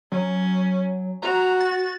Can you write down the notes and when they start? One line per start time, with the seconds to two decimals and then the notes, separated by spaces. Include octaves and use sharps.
0.12 F#3 C#4
1.22 F#4 A#5
1.60 A6